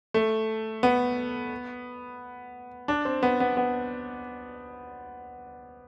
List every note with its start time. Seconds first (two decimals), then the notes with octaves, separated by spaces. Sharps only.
0.14 A3
0.83 B3
2.88 D4
3.05 C4
3.23 B3
3.40 B3
3.57 B3